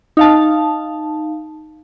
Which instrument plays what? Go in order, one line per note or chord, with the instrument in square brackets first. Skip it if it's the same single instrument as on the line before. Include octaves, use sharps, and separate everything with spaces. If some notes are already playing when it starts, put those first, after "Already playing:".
[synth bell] D#4 F5 A5